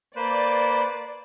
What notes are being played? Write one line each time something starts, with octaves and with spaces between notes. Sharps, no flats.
A#3 B4 C5 D5